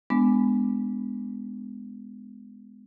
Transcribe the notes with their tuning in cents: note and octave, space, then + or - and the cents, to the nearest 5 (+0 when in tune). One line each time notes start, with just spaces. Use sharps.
G#3 +0 B3 +15 D4 +0